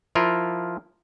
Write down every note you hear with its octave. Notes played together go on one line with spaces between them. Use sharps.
F3 E4 F4 A#4